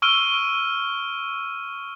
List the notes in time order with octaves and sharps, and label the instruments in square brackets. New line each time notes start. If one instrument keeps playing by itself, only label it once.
[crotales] C#6 E6 F6 D7 D#7 G7